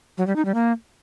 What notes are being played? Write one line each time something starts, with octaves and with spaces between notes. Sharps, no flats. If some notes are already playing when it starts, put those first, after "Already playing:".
F#3
G3
D#4
G3
A#3